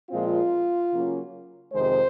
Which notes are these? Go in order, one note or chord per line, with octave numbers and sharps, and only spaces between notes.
A#2 F3 G#3 C4 F4
C#3 F#3 A#3 C#4
F2 C3 D#3 G#3 C5